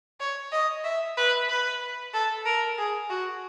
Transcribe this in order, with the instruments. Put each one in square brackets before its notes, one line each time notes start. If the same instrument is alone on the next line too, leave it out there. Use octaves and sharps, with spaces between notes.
[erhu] C#5
D#5
E5
B4
B4
A4
A#4
G#4
F#4